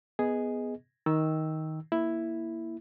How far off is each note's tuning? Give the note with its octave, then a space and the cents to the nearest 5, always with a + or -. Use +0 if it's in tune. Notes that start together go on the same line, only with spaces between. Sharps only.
B3 +0 G#4 +0 D#5 +0
D#3 +15 E6 -5
A#3 +0 E4 +0